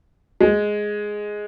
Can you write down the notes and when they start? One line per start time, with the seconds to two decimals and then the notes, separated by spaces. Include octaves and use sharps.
0.41 G#3